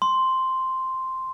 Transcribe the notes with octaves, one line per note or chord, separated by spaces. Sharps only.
C6